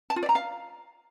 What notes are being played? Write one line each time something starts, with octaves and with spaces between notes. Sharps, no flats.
A5
F4
D5
A#5
F5